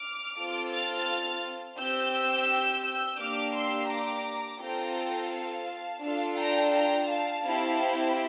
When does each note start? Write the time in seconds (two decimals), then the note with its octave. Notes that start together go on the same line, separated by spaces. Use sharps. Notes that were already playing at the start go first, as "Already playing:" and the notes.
Already playing: D6 F6
0.38 C4 F4 A4
0.73 F6 A6
1.79 C4 G4 E6 G6
2.85 E6 G6
3.20 A#3 D4 G4 D6 F6
3.56 C6 E6
3.91 A#5 D6
4.62 C4 F4 A4 G5 A#5
5.32 F5 A5
6.03 D4 F4 A4 F5 A5
6.38 G5 A#5
6.74 G5 A#5
7.09 F5 A5
7.45 C4 E4 G4